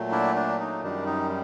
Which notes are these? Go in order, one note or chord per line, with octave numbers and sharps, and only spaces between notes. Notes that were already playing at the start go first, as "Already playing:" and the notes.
Already playing: A#2 F#3 A3
D4 E4
D4
D#4
F#2 D#3 G3 D4
D#4